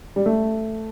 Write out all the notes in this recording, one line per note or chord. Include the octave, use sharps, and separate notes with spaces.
G3
A3